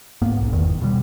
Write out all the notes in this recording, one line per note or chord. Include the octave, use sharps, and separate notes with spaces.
G1 G#2 A#3 B3
B1
F1 E2 D#3
B2 D3 G3